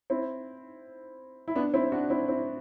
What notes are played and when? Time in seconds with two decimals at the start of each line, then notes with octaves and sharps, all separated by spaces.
0.10 C4 E4
1.48 E4
1.56 B3 D4
1.74 C4 E4
1.92 D4 F#4
2.10 C4 E4
2.28 C4 E4